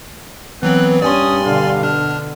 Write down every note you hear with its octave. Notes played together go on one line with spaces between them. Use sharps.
E3 F#3 B3 C4 F#6
G2 C#4 D5 G#5 C6 D#6
B2 D3 F5
D4 F6